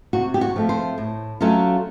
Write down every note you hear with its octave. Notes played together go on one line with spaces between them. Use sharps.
C3 F#4
G4
F#4
F3 A3 C4
C5
A2
F#3 A3 C#4 F4